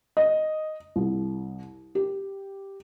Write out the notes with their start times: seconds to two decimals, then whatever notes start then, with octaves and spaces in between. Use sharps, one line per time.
0.17 D#5
0.96 C2
1.95 G4